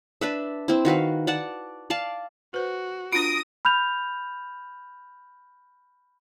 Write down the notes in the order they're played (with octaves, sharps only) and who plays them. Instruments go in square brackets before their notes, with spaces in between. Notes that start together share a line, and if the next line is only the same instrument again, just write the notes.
[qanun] D4 B4 E5
C4 E4
D#3 F#4 B4 F5
D5 F#5 A5
D5 F5 A5
[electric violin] F#4 [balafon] B4 C5
[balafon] D4 F4 [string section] D#6 [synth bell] A#6 D7
[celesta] B5 F6 G6 F7